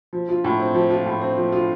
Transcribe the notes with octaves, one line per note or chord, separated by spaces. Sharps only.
F3
F4
A2
C4
F3
F4
A2
C4
F3
F4